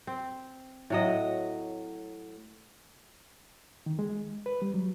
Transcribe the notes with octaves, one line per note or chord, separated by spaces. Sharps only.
C4
A2 F#3 D#5
D#3
G#3
B4
G3
F#3